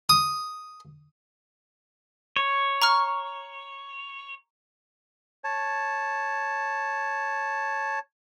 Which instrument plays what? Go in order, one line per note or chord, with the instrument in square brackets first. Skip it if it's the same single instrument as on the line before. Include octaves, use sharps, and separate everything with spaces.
[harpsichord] D#6
[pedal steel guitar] C#5
[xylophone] A#5 C#6 F6
[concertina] C#5 A5